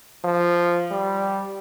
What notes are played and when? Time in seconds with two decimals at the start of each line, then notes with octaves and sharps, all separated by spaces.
0.24 F3
0.91 G3